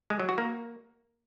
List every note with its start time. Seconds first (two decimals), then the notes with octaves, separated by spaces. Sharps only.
0.10 G#3
0.20 F#3
0.29 F#4
0.38 A#3